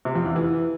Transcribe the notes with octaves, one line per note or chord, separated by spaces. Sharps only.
C3
F2
E2
E3